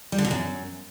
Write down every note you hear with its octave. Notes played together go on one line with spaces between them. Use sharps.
G3
D3
B2
F#2